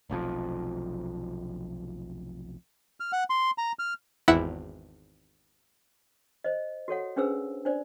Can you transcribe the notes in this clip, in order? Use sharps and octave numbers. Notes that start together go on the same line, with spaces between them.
F1 B1 F2 F3
F6
F#5
C6
A#5
F6
G#1 E2 E4 F#5 B6
C5 D#5
F#4 A4 C#5 F#5
C#4 D4 G#4 B4 C5 E6
D4 C5 D5